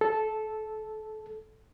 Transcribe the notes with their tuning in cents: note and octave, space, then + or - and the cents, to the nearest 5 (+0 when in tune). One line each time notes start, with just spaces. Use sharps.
A4 -10